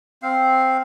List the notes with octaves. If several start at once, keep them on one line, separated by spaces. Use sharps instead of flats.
C4 F5